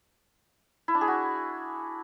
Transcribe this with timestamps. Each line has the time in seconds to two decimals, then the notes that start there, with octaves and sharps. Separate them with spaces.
0.88 E4
0.95 D4
1.01 G#4
1.08 F#4